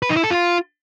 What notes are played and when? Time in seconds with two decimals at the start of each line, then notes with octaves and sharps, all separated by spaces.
0.02 B4
0.09 D#4
0.16 E4
0.23 A4
0.31 F4